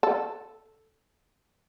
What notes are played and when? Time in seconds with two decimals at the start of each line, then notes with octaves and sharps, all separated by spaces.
0.03 A4